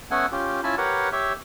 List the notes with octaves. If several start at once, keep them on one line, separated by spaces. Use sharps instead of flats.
A3 B3 C#4 A4 F#5 G#5
C#4 F4 G4
C#4 E4 F4 G#5 A5 B5
G4 A#4 B4 C#5 F#5
G4 C#5 E5